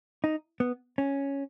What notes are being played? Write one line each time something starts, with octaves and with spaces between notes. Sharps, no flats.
D#4
B3
C#4